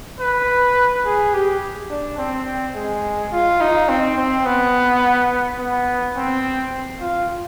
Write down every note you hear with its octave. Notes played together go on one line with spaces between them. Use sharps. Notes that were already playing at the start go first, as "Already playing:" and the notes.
B4
G#4
G4
D4
C4
G#3
F4
D#4
C4
C4
B3
B3
C4
F4